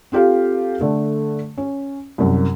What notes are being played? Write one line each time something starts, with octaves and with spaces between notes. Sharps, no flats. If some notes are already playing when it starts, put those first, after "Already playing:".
C4 F4 G4 A4 F5
D3 A3
C#4
C2 F#2